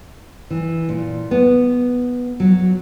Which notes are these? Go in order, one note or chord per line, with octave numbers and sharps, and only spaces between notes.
E3
A#2
B3
F#3